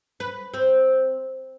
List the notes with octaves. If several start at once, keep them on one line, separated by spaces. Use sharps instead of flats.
B4
C4